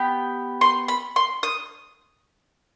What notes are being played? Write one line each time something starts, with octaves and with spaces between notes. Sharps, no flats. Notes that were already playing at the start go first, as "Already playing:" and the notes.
Already playing: B3 G4
C6
B5
C6
D#6